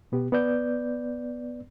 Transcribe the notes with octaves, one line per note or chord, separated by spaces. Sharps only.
B2 B3 G4
B3 B4 D5 G6